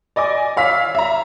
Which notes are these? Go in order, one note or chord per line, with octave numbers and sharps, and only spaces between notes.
D5 D#5 G#5 D6
C#5 F5 E6 B6
E5 A#5